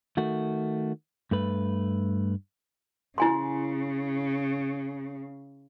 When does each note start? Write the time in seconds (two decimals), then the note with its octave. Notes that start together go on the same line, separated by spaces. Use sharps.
0.17 D#3 A3 F#4
1.31 G2 A3 B4
3.18 C#3 E4 G#5 C6